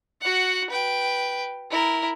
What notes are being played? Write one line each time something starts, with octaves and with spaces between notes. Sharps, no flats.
F#4 F#5
B4 G5
E4 A#4